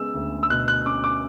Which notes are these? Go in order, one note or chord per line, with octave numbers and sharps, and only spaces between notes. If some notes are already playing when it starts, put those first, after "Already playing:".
Already playing: C#3 G#3 B3 E6
D2
E6
B2 F#6
F#6
C#4 D6
D6